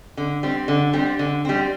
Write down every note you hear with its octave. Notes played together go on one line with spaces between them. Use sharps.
D3
G3 C4
D3
G3 C4
D3
G3 C4